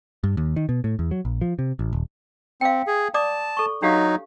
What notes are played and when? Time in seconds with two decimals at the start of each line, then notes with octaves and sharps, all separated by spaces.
0.24 G2
0.37 D#2
0.56 D#3
0.69 B2
0.84 A2
0.99 E2
1.11 F#3
1.25 A#1
1.41 F3
1.59 C3
1.79 A1
1.93 D#1
2.61 C4 F5 G5
2.87 G#4
3.14 D5 A5 D6 D#6
3.57 A4 C#6
3.82 F#3 D4 D#4 G4 F5